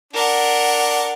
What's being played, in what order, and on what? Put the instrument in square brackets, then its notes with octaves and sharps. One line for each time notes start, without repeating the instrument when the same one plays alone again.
[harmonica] D4 [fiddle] A#4 F#5